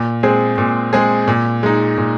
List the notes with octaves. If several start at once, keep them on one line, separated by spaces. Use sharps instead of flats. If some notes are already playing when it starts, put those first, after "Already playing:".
Already playing: A#2
G#3 C4 G#4
A#2
G#3 C4 G#4
A#2
G#3 D#4
A#2